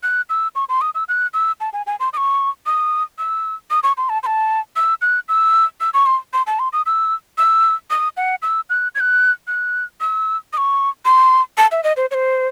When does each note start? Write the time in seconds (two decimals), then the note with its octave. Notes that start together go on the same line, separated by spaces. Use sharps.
0.03 F#6
0.29 E6
0.55 C#6
0.69 C6
0.81 D#6
0.95 E6
1.09 F#6
1.34 E6
1.60 A5
1.73 G#5
1.87 G#5
2.00 C6
2.13 D#6
2.17 C#6
2.66 D#6
3.18 E6
3.70 D#6
3.83 C#6
3.97 C6
4.09 A5
4.23 C6
4.26 A5
4.76 E6
5.01 F#6
5.28 E6
5.80 E6
5.94 C#6
6.06 C6
6.33 C6
6.47 A5
6.59 C6
6.73 D#6
6.86 E6
7.38 E6
7.90 D#6
8.17 F#5
8.42 E6
8.70 F#6
8.95 G#6
9.00 F#6
9.47 F#6
10.01 E6
10.53 D#6
10.57 C#6
11.05 C6
11.57 A5
11.72 E5
11.83 D#5
11.97 C5
12.11 C#5
12.14 C5